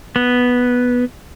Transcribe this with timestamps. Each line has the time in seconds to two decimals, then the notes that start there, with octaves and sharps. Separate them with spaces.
0.16 B3